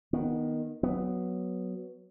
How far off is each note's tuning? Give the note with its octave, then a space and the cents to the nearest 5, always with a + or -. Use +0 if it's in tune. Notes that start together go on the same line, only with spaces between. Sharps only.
D#3 -5 B3 -20
F#3 +0 B3 +0